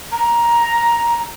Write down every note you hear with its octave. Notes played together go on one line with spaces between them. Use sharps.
A#5